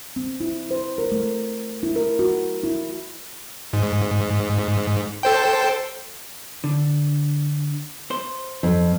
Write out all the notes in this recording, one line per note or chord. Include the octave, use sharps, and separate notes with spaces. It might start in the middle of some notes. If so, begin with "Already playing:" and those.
C4
E4
C5
A#4
A3
E4
A#4
F#4
E4
G#2
A4 C5 G5
D3
C5
F2